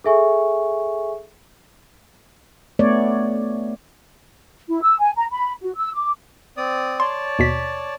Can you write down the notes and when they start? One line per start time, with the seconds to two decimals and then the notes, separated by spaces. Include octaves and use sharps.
0.04 G#4 A4 E5 G#5 C#6
2.79 A3 B3 C#5 D5
4.69 E4
4.82 E6
4.99 G#5
5.16 A#5
5.31 B5
5.62 F#4
5.76 E6
5.94 D6
6.57 C4 D5 D#6
7.00 C#5 D5 A5 C6
7.39 D#2 B2 B6